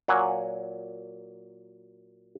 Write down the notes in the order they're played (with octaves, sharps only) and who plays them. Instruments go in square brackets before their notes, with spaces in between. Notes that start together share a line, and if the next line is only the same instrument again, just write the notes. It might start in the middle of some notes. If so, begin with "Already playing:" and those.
[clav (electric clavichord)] A#2 F#3 A#4 F#5 G#5